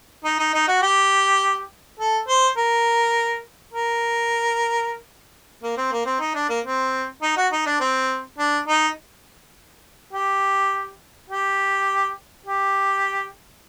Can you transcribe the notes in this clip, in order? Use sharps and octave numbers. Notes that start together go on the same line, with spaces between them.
D#4
D#4
D#4
F#4
G4
A4
C5
A#4
A#4
A#3
C4
A#3
C4
D#4
D4
A#3
C4
D#4
F#4
D#4
D4
C4
D4
D#4
G4
G4
G4